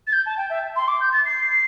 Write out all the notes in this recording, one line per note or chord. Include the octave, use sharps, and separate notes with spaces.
A6
G6
A5
G5
E5
C6
D6
G6
A6
C7